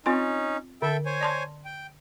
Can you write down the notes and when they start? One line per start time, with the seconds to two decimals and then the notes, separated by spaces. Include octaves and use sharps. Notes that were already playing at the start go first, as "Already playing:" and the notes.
0.06 C4 C#4 D#4 F4 C6
0.82 D3 A4 E5 G5
1.06 C5 C#5 G#5
1.21 D5 A5 C6
1.65 G5